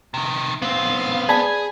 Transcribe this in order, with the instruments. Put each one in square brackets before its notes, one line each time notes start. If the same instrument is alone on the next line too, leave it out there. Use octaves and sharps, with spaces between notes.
[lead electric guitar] C3 D#3
[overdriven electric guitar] B3 C4 [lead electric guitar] F5
[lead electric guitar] G#4 [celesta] D5 A5 [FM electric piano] G#5 B5 G#6